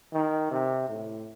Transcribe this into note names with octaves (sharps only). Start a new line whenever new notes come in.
D#3
C3
A2